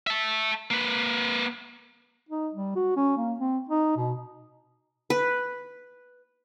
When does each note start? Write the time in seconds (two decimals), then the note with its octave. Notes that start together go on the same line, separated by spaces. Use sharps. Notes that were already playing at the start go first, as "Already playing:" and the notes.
0.07 E5 A5
0.71 A#3 B4
2.29 D#4
2.54 G3
2.76 F#4
2.96 C#4
3.17 A#3
3.40 C4
3.69 D#4
3.96 B2
5.10 B4